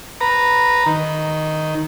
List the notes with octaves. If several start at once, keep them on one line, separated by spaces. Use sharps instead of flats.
B4 A#5
D#3